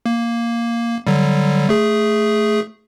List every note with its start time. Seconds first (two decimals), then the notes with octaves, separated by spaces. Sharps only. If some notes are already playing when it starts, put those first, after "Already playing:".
0.06 A#3
1.07 D3 F#3 G3
1.69 A3 G#4